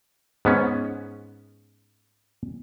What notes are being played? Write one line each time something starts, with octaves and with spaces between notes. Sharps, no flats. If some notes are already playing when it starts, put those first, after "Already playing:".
G#2 B3 C#4